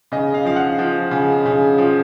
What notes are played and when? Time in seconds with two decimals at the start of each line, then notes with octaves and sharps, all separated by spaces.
0.12 C#3 D#5
0.34 F5
0.45 F3 F5
0.56 F#5
0.79 F3
1.11 C#3
1.46 C#3
1.78 F3